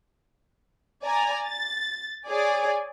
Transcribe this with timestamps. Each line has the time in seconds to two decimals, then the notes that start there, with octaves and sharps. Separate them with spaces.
1.05 D5 G#5 A#5
1.45 A6
2.27 G#4 C#5 D5 G#5